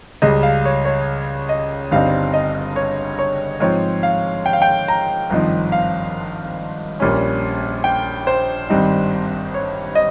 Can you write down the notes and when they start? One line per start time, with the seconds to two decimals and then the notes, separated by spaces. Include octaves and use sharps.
0.22 C#2 C#3 G3 D#5
0.43 F5
0.65 C#5
0.85 C#5
1.49 D#5
1.91 G1 G2 G3 C4 D#4 F5
2.34 D#5
2.76 C#5
3.19 C#5
3.60 G#2 F3 C4 C#5
4.03 F5
4.46 G5
4.53 F5
4.62 G5
4.88 A#5
5.30 G#1 G2 F3 C4 D#4
5.72 F5
7.00 A#1 A#2 G3 C#4
7.84 G5
8.27 C5
8.70 G#1 G2 G3 C4 D#4
9.54 C#5
9.95 D#5